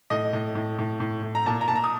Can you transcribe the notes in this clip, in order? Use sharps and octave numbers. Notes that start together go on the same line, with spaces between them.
A2 D#5
A2
A2
A2
A2
A2
A#5
A#2 A5
A#5
A#2 A5
A#5
D#6